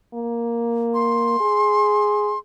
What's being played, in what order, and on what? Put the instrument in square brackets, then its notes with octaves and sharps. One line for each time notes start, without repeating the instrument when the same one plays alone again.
[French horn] A#3
[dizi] C6
[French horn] G#4